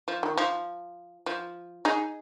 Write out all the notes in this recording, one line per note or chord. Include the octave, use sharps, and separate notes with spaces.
F3
D#3
F3
F3
D#4 G#4